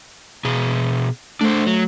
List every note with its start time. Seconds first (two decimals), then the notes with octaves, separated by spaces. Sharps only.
0.45 B2 G#4
1.41 A3 D4 C5
1.67 F#3